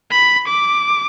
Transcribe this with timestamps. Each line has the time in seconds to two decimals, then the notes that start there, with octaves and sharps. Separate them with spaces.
0.11 B5
0.47 D6